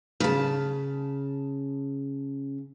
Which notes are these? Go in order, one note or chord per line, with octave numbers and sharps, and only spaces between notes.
C#3 A5